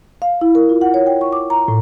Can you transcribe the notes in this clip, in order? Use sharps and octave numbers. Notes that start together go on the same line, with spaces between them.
F5
E4
A#4
F4
F#5
C#5
G5
C#6
D6
A#5
A2